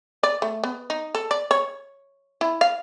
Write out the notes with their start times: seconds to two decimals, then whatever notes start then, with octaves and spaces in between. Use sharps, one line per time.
0.23 D5
0.42 A3
0.64 B3
0.90 D#4
1.15 A4
1.31 D5
1.51 C#5
2.41 E4
2.61 F5